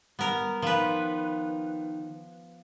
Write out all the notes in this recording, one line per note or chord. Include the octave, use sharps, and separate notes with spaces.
G3 B3 A#4
D#3 F3 B4